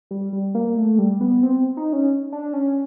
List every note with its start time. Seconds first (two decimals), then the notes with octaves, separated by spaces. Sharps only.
0.11 G3
0.33 G3
0.55 A#3
0.77 A3
0.98 G3
1.21 B3
1.43 C4
1.77 D#4
1.93 C#4
2.32 D4
2.53 C#4